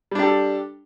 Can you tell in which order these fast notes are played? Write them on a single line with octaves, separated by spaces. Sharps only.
G3 D4 G4 A4